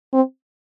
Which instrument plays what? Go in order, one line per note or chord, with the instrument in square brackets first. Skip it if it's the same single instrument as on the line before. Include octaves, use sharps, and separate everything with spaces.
[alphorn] C4